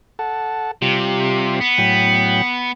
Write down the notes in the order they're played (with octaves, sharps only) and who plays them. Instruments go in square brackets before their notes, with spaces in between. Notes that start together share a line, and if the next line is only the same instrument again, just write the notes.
[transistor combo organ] A4 F#5 A5
[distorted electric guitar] C3 [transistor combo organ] G3 F4 G4
[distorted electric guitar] B3
[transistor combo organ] A2 F#3 G5